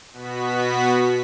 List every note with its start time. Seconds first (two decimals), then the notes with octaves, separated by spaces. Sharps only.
0.13 B2 B3 F#4 B6